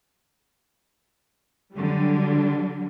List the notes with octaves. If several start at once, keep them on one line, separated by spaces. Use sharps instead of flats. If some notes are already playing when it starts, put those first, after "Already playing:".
D3 F#3 G3